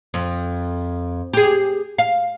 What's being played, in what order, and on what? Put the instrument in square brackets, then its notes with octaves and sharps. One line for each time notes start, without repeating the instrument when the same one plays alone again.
[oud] F2
G4 G#4
F5